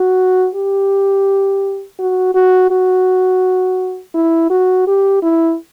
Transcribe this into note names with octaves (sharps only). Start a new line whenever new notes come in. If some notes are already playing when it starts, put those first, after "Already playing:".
Already playing: F#4
G4
F#4
F#4
F#4
E4
F#4
G4
E4